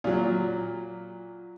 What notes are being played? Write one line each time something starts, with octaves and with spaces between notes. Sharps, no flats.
A#2 F#3